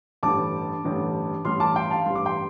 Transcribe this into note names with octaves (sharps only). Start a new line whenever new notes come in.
A1 G2 D3 G3 A5 D6
A1 G2 D3 G3
A1 G2 G3 C6 F6
A5 D6
G5 C6
F5 A5
A1 G2 G3 C6
D6
G5 C6